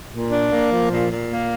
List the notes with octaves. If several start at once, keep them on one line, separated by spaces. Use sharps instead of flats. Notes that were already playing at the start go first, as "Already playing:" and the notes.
A#2
D4
A#3
F3
A#2
A#2
A#3